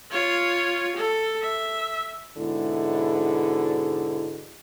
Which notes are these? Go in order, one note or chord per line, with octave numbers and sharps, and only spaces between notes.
F4 C#5
A4
E5
G#2 B2 D3 G#3 E4